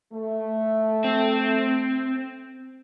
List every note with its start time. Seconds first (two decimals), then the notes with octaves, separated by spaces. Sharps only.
0.13 A3
1.04 C4